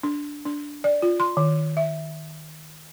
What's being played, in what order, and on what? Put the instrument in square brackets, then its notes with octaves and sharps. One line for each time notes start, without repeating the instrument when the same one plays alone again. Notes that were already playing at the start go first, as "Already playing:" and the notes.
[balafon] D4
D4
D5
F4
C6
D#3
E5